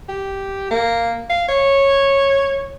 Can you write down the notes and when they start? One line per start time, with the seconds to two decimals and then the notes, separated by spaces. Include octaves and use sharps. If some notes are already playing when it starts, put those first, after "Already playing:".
0.09 G4
0.71 A#3
1.30 F5
1.49 C#5